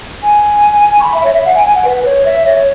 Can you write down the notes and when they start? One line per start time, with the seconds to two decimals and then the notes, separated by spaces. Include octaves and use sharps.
0.23 G#5
1.00 C#6
1.04 B5
1.14 E5
1.24 C#5
1.34 E5
1.45 F#5
1.55 G#5
1.65 G#5
1.75 F#5
1.85 B4
2.05 C#5
2.26 E5
2.46 C#5